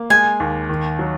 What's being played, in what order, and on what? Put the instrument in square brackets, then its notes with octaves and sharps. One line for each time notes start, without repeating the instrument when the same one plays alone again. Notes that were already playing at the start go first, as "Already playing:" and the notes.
Already playing: [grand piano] A#3
[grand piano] G#3 [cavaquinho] G#5
[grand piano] D#2
D#3
F#3